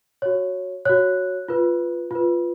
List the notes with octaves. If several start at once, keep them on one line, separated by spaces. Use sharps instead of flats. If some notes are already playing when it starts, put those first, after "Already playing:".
F#4 C#5
F#4 C#5 F#6
F4 B4
F4 B4